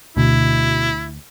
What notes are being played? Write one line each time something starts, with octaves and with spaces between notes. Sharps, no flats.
D2 B2 E4